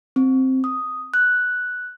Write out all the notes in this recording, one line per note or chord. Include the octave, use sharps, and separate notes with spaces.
C4
D#6
F#6